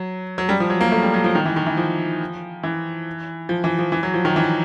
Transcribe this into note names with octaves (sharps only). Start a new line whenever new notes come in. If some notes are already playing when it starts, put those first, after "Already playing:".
Already playing: F#3
F#3
G3
F3
F#3
A#3
A3
G3
F#3
F3
D#3
E3
D#3
E3
F3
E3
F3
E3
F3
E3
F#3
F3
D#3
E3